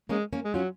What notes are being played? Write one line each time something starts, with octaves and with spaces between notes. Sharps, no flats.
G#3 A#3 C#4
A#3 C#4
G#3
F#3 C#4 F4